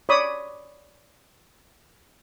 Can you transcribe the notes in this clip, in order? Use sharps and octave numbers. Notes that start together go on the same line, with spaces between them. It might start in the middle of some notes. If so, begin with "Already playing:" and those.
C#5 D5 B5 D#6